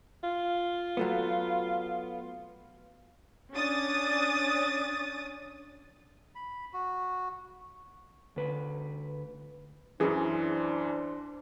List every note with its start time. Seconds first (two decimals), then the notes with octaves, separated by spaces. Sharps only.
0.23 F4
0.97 F#3 A3 B3
3.54 C#4 D4 D#6 A6
6.35 B5
6.73 F#4
8.36 D2 B4
10.00 F#2 E3 C#4 D4 G#4 B4 C5